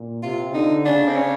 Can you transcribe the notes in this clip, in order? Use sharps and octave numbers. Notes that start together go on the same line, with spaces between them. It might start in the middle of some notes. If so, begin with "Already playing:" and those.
Already playing: A#2
C3 F4
D3 D#4
C#3 D4
C4
C#4